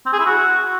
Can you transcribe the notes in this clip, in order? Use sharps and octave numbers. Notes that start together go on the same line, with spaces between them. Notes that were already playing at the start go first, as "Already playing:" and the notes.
C4
G#4
E4
F#4